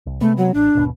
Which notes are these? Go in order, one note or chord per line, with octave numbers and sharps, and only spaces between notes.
C2
C3 G#3 A3 B3
F#3
A1 D4
G#1 D#2 B2